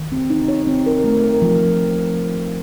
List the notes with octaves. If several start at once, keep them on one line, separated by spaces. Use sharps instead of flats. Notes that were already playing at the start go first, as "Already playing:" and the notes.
Already playing: D#3
C4
D#4
C#5
C4
A#4
A3
A#4
F3